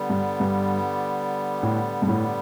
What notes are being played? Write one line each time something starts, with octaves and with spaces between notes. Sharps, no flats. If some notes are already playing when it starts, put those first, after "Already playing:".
Already playing: D3 G3 B3
G2
G2
A2
G2
A2